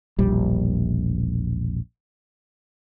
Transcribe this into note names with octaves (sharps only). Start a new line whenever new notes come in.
E1 A#1 G3